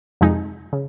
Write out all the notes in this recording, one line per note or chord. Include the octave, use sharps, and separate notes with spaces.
F2 C3 F3 G#3 D#4
C#3